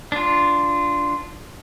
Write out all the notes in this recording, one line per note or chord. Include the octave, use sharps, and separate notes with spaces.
D4 F4